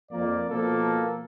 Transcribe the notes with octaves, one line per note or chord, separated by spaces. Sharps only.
F2 A#3 D5
B2 F3 A#3 A4